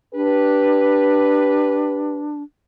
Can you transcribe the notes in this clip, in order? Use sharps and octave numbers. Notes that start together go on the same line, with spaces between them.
D4 G4 B4